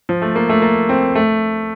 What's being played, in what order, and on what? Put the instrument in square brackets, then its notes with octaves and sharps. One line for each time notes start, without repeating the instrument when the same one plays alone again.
[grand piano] F3
A3
A#3
A3
A#3
C4
A3